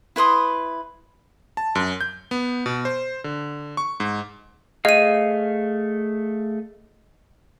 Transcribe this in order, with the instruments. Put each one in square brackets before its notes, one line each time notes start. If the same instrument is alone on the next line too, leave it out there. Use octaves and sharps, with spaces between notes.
[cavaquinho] E4 B4 C6 D#6
[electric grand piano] A5
F#2
G6
B3
B2
C5
D3
C#6
G#2
[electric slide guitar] A3 G#4 F5 [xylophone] D#5 D#7